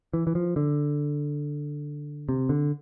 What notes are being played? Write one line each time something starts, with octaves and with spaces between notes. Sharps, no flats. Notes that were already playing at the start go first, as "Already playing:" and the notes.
E3
E3
F3
D3
C3
D3